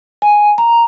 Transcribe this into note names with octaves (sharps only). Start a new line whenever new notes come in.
G#5
A#5